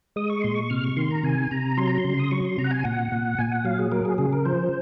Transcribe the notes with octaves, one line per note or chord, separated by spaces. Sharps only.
G#3 D#6
C#6
A#2 C6
C#6
C3 F6
C#6
D#3 C6
A#5
C3 G#5
C3 A#5
F#3 C6
A#5
C6
C#3
D#6
F#3 C#6
C6
C3 A#5
F#5
G#5
A#2 F#5
A#2
A#2 G#5
F#5
F#3 F5
G#4
F#3 A#4
G#4
C#3 G#4
A#4
F3 C5